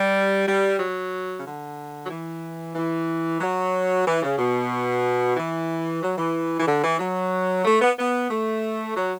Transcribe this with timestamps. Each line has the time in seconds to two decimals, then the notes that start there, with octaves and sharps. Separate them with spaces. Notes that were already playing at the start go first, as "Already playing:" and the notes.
Already playing: G3
0.46 G3
0.80 F#3
1.38 C#3
1.45 D3
2.05 F#3
2.10 E3
2.75 E3
3.40 F#3
4.06 E3
4.23 C#3
4.38 B2
5.37 E3
6.02 F#3
6.18 E3
6.60 E3
6.66 D3
6.83 E3
6.99 F#3
7.65 A3
7.81 B3
7.99 B3
8.30 A3
8.95 F#3